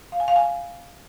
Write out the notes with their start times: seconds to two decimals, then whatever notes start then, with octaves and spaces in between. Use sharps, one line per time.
0.12 F5
0.20 G#5
0.28 F5
0.36 G#5